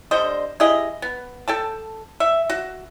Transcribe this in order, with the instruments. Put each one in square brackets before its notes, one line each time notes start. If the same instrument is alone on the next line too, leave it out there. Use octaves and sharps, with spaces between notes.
[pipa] D3 G3 C5 D#5
E4 G4 G#4 D#5
B3
A4 G5 A5
E5
F#4